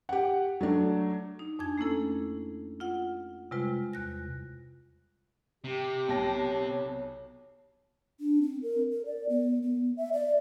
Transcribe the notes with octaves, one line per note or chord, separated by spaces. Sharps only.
G4 F#5
F#3 A3 D4
D#4
F2 D4 G#5 G#6
A3 A#3 C#4 E4 A4
F4 F#5
C3 G3 G#3 F4 B4
E2 F#6 A#6
C3 G4
B1 C#5 A5 A#6
D4
C4
A#4
A#4
D5
B3
B3
E5
D5